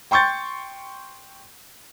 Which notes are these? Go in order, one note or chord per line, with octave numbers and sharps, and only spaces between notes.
G5 C6 C#6 G6 A6